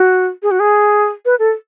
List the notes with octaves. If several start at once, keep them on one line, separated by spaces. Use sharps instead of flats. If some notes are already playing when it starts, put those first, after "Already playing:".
Already playing: F#4
G#4
F#4
G#4
B4
A4